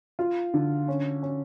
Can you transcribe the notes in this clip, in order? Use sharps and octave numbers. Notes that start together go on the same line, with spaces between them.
F4
D3
C#4
C#4